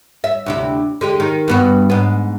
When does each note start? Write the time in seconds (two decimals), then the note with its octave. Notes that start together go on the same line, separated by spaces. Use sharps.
0.24 E5
0.46 D2 C3 E4
1.01 D3 G#3 G4
1.20 D#3
1.48 G2 B3 F#4
1.90 G#2 B3